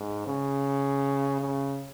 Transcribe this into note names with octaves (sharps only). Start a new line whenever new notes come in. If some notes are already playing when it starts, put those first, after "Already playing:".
Already playing: G#2
C#3
C#3